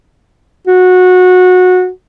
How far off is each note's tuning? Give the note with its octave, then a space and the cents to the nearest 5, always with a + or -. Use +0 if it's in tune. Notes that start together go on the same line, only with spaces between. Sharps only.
F#4 -20